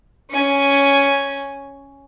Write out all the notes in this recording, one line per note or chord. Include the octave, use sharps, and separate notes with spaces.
C#4 G#5